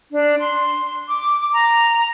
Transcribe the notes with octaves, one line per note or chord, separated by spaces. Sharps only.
D4
C6
D6
A#5